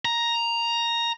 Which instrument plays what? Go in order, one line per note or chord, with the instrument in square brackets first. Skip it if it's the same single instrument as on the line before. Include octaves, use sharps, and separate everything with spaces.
[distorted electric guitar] A#5